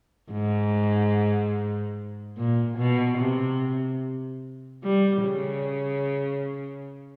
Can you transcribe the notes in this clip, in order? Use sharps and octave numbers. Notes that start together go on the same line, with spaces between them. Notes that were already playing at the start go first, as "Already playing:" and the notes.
G#2
A#2
B2
C3
G3
C#3